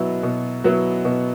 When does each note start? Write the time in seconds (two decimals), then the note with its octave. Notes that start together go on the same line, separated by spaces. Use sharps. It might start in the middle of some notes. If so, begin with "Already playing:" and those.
Already playing: B2 F#3 B3 E4
0.23 B2
0.64 F#3 B3 E4
1.05 B2